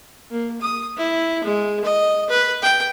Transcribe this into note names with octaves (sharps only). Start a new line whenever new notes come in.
A#3
D#6
E4
G#3
D#5
B4
G5